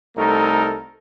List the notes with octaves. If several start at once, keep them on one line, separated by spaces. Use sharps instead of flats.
C2 A3 D#4 A4 A#4